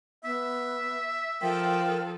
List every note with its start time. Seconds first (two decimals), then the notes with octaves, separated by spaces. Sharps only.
0.24 B3 E5
1.42 F3 A4 A#4 G5